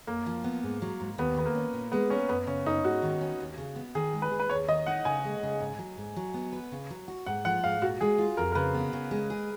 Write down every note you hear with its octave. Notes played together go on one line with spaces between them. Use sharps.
F#2 A#3
F3
B3
G#2
F#3
G#2
D#2 B3
D#3 B3
A#3
C#4
A#2
G#3 B3
C#4 A#4
F#2 B3
C#3 C#4
F#2 D#4
G#2 F#4
D#3
C#4
D#2
C#3
B3
D#3 G#4
G#3
B4
G#4
B4
D#2 C#5
D#3 D#5
D#4 F#5
C#3 G#5
G#3
C#3
G#2
F#3
G#2
F#3
B3
B4
C#3
F#3
F#4
G#2 F#5
F3 F#5
G#2 F5
A#2 F#4
G#3 G#4
F4
F2 A#4
A#4
C#3 B4
B3
C#3
G#3
G#4